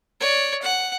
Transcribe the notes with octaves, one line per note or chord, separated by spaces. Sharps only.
C#5 D5
F#5